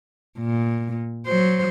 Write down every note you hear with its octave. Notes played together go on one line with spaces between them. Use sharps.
A#2
F#3 C5